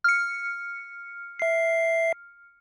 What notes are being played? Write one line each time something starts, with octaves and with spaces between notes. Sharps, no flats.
F6 C#7
E5 C7